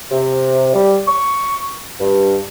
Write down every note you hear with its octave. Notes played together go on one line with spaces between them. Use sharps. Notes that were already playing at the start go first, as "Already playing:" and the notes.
C3
G3
C#6
G2